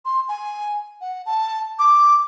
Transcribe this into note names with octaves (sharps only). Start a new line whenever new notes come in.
C6
G#5
F#5
A5
D6